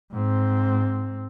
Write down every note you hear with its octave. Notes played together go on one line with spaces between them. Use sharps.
G#2 C4